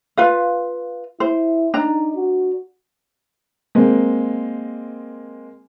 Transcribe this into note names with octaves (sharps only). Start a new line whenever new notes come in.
F4 B4 F5
E4 C5
D4 D#4 A#5
F#4
G#3 A#3 C4